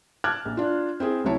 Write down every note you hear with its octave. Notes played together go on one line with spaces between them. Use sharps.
A5 D6 F6 F#6 G#6 A6
A#1
D4 F4
C4 E4 G#4
D2 C3 F#3 E4 C#5 A5